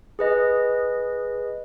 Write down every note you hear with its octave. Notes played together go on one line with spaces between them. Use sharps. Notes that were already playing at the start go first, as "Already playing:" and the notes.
G#4 B4 D#5